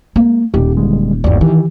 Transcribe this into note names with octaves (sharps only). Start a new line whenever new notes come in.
G#3 A#3
D#1 G4
D3 G3 G#3
G1 D#2 D5
D#3 E3 G4